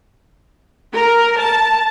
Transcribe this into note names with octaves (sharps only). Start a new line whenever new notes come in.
A#4
A5